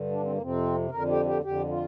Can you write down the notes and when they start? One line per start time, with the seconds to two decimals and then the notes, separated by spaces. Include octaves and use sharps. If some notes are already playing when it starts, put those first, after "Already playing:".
Already playing: G2 D3
0.12 D4
0.22 C4
0.32 A#3
0.38 F2 C3 C4
0.91 F2 D3 A#4
1.09 G4
1.26 G4
1.44 F2 D3 G4
1.69 F4